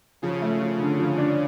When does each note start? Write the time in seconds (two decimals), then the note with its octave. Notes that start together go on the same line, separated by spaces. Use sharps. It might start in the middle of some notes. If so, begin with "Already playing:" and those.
0.22 C#3 F3
0.42 A3
0.60 F3
0.80 D3
0.99 F3
1.18 D4